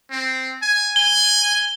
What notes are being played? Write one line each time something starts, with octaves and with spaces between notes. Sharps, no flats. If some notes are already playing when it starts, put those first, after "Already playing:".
C4
G#5
G#5 G7